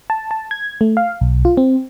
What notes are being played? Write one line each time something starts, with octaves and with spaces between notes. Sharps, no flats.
A5
A5
G#6
A3
F5
B1
F4
C4